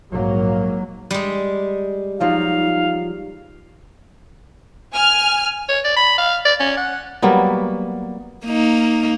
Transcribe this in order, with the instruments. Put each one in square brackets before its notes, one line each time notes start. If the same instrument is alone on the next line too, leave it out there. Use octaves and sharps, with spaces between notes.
[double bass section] A#1 G#2 F#3 A#3
[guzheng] G3 G#3
[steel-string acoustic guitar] F3 F#3 F4 [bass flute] D#4 [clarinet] F5
[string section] G#5 F6
[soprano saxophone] C#5
D5
B5
F5
D5
C#4
F#5
[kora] F#3 G3 A#3 B3
[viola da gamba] A#3 D#4